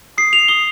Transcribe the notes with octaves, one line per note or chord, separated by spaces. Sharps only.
D#6 C7
F7
D#6 G7